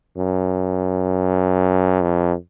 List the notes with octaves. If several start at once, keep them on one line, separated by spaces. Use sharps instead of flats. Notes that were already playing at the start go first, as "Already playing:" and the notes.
F#2
F2